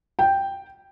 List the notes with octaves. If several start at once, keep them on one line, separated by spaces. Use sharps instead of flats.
G5